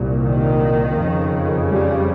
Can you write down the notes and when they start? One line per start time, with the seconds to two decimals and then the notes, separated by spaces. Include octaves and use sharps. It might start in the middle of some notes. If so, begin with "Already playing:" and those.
Already playing: C2 A#2
0.22 D#3
0.95 F2 C#3
1.68 G3